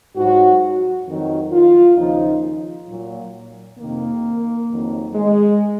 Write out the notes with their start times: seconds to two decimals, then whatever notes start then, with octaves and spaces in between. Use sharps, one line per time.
0.16 G#2 F#3 F#4
1.07 F2 D#3 F#3
1.52 F4
1.97 D#2 C#3 F3 D#4
2.89 A#2 F#3
3.79 F2 C3 D#3 A#3
4.70 F2 D#3 F#3
5.15 G#3